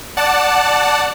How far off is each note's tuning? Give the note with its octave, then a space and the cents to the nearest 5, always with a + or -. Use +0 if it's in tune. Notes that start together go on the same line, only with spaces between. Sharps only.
D5 +0 F#5 +0 A5 +0